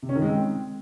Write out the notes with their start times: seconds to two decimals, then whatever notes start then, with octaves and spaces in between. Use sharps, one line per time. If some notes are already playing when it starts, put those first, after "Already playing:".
0.03 C3
0.09 C#4
0.15 D#3
0.22 G#3
0.28 C4